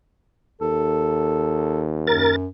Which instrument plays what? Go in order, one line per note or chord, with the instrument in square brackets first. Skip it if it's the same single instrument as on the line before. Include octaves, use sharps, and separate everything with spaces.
[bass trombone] D#2 [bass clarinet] A4
[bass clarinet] F#2 [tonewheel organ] A#4 A6